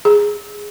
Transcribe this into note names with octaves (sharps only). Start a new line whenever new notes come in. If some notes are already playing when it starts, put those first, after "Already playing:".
G#4